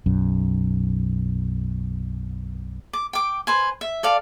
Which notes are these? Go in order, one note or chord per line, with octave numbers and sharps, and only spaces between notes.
B1 F#2
D6
G5 D6
B4 C5 G#5
E5
A4 D5 F5